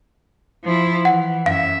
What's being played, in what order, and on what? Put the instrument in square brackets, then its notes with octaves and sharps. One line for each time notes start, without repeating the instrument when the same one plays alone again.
[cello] F3 E4
[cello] E3 [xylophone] F#5
[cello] F#2 E5 [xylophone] F5